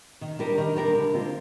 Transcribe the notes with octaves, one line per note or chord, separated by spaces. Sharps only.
D#3
G3 D4 G4 A#4
D#3
G3 D4 G4 A#4
D3
G#3 C4 F4